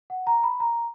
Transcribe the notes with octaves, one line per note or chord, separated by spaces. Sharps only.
F#5
A#5
B5
A#5